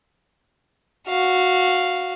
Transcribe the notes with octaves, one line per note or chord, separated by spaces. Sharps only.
F#4 F5